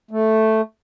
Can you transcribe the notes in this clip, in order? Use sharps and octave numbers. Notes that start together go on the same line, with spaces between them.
A3